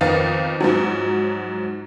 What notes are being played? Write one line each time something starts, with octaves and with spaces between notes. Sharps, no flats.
F2 D#3 B3 D#4 F5 A6
G#2 F3 F#3